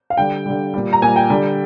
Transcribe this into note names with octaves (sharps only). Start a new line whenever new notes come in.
F5
D3 G3 G5
D3 G3
A#2 G3
A#5
A#2 G3 G#5
G5
D3 G3